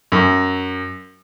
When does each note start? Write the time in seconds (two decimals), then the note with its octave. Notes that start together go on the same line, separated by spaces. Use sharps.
0.12 F#2